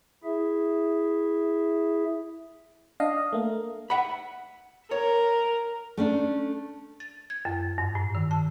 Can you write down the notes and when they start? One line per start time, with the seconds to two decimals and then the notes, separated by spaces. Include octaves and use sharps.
0.24 E4 G#4 E5
3.00 D4 D#5 F5
3.33 A3 A#3
3.90 E5 F#5 B5
4.91 A#4 C#5
5.97 A3 C#4 D4
7.00 A6
7.30 G#6
7.45 F#2
7.78 G2
7.95 A2
8.15 D#3
8.31 A5